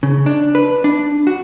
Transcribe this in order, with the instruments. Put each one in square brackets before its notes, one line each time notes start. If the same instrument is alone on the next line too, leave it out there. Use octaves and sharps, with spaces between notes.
[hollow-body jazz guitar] C#3
D4
B4
D4
F#4